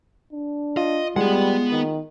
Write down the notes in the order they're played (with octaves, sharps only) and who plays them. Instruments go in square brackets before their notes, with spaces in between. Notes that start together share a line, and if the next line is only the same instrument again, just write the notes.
[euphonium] D4
[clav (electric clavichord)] F4 [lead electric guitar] D#5
[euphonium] G3 [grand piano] G#3 [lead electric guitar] B3 F#5
[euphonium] D#3